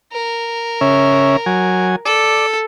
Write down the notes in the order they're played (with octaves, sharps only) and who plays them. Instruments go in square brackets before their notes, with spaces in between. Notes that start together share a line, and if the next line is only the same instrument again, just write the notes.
[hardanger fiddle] A#4
[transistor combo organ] C#3 C#4 E5
F#3 G#5
[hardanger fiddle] A4 [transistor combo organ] D5